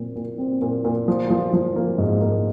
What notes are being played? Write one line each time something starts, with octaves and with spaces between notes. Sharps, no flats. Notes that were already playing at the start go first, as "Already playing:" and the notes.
Already playing: A#2 C4
A#2
C4
A#2
A#2
F3
F3
F3
A#3
G#2
A#3